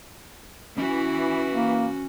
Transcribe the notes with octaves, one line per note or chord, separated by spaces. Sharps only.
E3 C#4 F#4
A#3